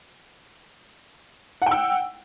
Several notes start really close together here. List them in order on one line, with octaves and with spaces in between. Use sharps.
F#5 G5 E6